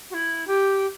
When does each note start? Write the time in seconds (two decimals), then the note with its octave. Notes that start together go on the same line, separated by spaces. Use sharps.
0.10 F#4
0.14 E4
0.47 G4